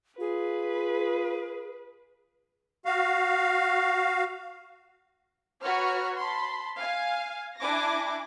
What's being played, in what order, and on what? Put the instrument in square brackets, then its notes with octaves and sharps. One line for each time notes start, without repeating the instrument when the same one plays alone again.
[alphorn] F4 [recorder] G#4 [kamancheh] B4
[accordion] F#4 F5
[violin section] F#4 B4 C#5 F#5 A#5 F6
A5 B5 C6
F5 G#5
D4 E4 G#5 D6 A#6